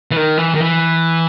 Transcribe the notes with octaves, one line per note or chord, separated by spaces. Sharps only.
E3
D#3
E3
D#3
E3